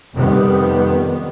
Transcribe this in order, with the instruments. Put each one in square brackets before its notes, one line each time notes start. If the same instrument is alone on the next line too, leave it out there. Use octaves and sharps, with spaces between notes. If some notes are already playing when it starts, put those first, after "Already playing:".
[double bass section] F2 C3 D#3 G3 B3